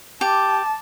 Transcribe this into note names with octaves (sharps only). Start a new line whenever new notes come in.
G4 A5